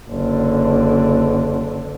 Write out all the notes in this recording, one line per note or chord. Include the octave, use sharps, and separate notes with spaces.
F#1 D3